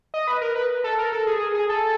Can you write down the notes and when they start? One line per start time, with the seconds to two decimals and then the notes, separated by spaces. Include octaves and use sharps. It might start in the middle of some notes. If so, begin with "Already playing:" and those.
0.14 D#5
0.27 B4
0.41 A#4
0.56 B4
0.84 A4
0.98 A#4
1.12 A4
1.27 G#4
1.55 G#4
1.69 A4